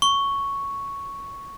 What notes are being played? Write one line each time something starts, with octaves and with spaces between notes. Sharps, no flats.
C#6